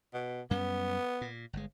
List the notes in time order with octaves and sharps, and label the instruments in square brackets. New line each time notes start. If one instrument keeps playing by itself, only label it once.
[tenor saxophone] B2
[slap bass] F#2 G3 C#4 [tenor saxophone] B3
[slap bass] A#2
G1 G#3